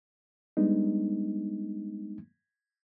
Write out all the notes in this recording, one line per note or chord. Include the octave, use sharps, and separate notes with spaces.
G3 G#3 B3 D4 D#4